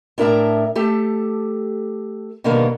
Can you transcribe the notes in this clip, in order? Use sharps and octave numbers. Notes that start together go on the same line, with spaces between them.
A2 D4 A#4 E5 A5 A#5
A3 G4 A4
B2 D3 D#3 G3 A#3 B3